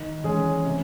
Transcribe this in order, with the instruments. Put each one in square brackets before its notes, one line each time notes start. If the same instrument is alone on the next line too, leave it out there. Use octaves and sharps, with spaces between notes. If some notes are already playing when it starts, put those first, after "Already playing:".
Already playing: [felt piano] D#3
[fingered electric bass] E3 [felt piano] G#3 C#4 G#4
[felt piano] C3